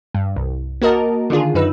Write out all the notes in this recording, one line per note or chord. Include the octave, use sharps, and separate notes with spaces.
G2
C2
A#3 F#4 A#4 D#5 A5
D3 D#3 D4 F4 G#4
F#2 D#4 B4 E6